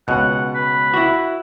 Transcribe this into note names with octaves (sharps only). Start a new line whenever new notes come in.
C#2 B2 F#5
B4
E4 F#4